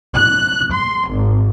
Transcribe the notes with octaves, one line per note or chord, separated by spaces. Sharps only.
F#6
C6
G#1